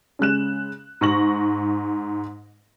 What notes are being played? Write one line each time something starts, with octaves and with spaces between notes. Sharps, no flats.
C#3 G#3 F#6 E7
G#2 C#6 A#6 F#7